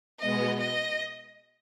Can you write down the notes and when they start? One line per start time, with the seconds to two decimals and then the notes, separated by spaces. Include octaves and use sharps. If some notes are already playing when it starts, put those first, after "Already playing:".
0.19 B2 G#3 B3 D#5
0.59 D#5